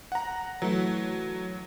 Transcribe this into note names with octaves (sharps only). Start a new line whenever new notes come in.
F#5 A#5
E3 F#3 A3